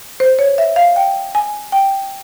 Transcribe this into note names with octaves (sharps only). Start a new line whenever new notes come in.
C5
C#5
E5
F5
G5
G#5
G5